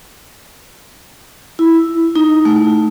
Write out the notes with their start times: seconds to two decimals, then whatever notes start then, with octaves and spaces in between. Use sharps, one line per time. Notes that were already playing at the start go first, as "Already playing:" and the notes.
1.59 E4
2.16 D#4
2.45 A3